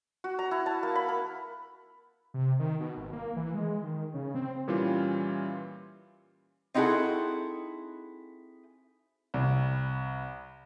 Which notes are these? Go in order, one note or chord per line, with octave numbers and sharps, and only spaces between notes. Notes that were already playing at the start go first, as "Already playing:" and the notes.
F#4
A#5
E4
A5
A#3
B5
A#4
C3
D#3
B2
G#1
A#3
E3
G#3
D#3
C#3
C4
A#2 E3 G3 C#4 F4
C4 D#4 E4 F#4 G#4 A4
C2